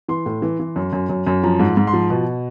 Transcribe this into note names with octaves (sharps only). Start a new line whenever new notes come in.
E3 C6
A2
E3
E3
F#2
F#2
F#2
F#2
F3 A#5
G#2
G#2
C6
F3
B2